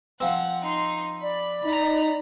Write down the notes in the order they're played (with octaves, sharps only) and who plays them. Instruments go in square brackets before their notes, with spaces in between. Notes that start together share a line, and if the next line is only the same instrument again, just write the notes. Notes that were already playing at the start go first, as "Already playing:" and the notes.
[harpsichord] F3 C4 [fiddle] F#5
[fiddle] D#4 C6
[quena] D5 [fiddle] B5
[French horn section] D#4 [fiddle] A#5 B5